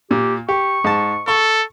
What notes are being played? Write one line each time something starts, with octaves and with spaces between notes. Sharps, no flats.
A#2 G4
G4 C#6
G#2 A5
A4 C#6